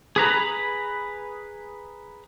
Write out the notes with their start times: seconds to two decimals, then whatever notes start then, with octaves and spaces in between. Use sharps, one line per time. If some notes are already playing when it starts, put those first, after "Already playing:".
0.16 G#4 B4 A#5 B5